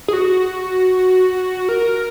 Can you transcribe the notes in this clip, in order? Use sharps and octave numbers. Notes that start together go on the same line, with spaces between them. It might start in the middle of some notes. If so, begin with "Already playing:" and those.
G#4
F#4
A#4